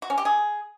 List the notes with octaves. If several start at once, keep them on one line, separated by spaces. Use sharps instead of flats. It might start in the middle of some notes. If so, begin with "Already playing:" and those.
F#4
C#4
G4
G#4